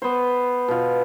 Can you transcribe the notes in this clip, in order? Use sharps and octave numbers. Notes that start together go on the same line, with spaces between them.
B3 C5
B2 F4